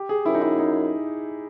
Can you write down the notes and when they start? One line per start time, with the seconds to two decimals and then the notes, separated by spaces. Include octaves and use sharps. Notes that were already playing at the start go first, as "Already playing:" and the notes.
Already playing: G4
0.09 G#4
0.26 F#2 E4
0.35 D#4
0.42 E4
0.59 D#4